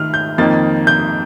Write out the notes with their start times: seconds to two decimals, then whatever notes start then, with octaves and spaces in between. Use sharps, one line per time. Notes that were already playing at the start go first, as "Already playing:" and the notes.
Already playing: D#3 A3 F6
0.14 G6
0.38 F2 D#3 A#3 D#4 A6
0.87 G6